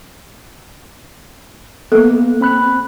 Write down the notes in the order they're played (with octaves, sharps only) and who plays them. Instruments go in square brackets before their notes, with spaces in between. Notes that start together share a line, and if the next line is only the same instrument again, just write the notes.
[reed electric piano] A#3 B3 [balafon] A4
[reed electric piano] C4 B5 F#6